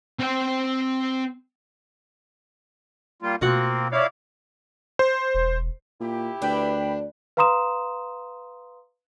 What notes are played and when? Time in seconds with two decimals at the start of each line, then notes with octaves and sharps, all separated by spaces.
0.20 C4 G5
3.22 G3 A#3 F4
3.41 B2 A3 A#3 C4 F4 F#4 F#5
3.92 E4 C#5 D5 F5
4.99 C5
5.35 E1
6.00 A#2 E4 G4
6.42 D2 D4 B4 G5 B5
7.37 B4 F5 A#5 C6 D#6 E7